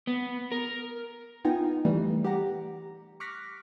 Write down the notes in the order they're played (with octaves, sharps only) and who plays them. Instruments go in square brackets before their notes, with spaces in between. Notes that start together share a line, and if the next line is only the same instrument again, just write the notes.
[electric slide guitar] B3
A#4
[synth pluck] B3 D#4 F4 G5 G#5 A#5
E3 G3 A3
G4 F#5 A#5
C#6 D6 F6 F#6 A#6 B6